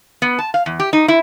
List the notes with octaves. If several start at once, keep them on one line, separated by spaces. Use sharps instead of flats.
B3
A5
F5
E2
G4
D#4
E4